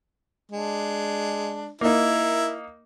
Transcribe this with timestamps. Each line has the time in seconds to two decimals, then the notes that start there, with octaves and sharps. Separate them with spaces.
0.52 G#3 D4
1.81 A#3 D#4 E4 A#4